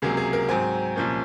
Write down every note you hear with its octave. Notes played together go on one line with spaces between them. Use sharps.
C#2 C3 F#3 A#3 G#4
G#4
A#4
G#2 F#3 C4 G#5
C2 A#2 F3 A#3 C#4